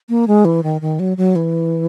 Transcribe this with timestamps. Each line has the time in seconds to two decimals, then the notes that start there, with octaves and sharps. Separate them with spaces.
0.09 A#3
0.28 G#3
0.45 E3
0.63 D#3
0.81 D#3
0.99 F#3
1.17 F#3
1.36 E3